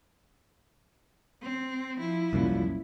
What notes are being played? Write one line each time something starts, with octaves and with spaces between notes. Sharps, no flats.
C4
F3 E4
C2 F#2 A#2